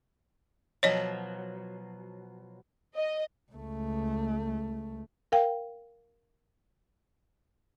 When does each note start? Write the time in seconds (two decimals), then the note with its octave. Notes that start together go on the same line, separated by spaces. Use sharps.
0.83 B2 F3 F#3 C#5 D#5
2.97 D#5
3.52 C#2 A3
5.32 A#4 F5 G5